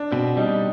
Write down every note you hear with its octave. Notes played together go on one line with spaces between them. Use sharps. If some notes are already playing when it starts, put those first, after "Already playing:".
Already playing: D4
B2 C4
G3 D#4